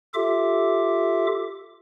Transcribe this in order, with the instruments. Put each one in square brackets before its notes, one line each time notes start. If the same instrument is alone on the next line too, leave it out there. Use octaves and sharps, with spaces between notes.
[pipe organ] F4 G4 A4 E5 D6